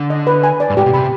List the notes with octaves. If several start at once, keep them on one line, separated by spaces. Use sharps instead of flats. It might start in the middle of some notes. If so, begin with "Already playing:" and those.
Already playing: D3
D#5
B4
G#5
D5
G2
G#2 G4
B2
C3 B5